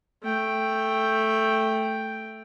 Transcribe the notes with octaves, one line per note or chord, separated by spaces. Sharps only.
A3 G5